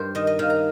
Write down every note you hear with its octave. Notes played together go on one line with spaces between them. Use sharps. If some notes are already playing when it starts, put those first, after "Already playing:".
Already playing: G2 A#4 C5
D#3 D#5
D#5
D#3 F5
A#5